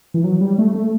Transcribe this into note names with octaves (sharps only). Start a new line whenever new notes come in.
E3
F#3
G3
A3
A3